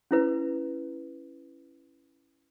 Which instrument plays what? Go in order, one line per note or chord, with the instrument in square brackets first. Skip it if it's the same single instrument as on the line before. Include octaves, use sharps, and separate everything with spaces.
[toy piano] C#4 E4 B4